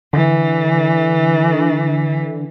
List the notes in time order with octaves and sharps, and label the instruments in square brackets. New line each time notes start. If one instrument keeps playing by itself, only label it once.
[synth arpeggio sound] D3 [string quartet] E3